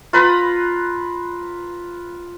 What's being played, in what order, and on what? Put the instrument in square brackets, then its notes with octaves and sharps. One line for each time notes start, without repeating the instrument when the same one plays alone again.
[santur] F4 B4 A#5 B5